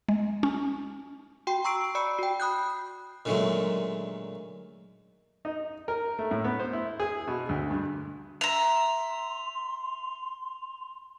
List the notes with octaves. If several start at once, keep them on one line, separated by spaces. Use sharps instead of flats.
G#3
C#4
F#4 G5 C6
A#5 C#6 E6 C7 D7
D5 B5 E6 C#7
F#4 G5
B5 D#6 F#6 G6
A#2 D3 D#3 F#3 G#3 A3
D#4
A#4
A3
A2
B3
C5
E4
G#4
B2
D2
G2
E5 A#5 C6 F7